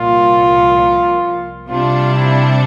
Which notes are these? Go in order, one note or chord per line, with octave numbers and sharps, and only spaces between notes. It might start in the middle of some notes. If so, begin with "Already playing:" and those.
Already playing: C2 A#2 F3 F4
C3 G3 D4 F4
E4